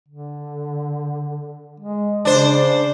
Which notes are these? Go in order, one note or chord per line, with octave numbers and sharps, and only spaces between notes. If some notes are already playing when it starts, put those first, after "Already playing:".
D3
G#3
C#3 D4 C5